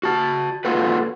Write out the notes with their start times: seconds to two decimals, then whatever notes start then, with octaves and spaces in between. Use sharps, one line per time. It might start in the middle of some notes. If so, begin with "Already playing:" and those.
0.03 F#4 A5
0.65 A#3 F4 F#4 A4 B4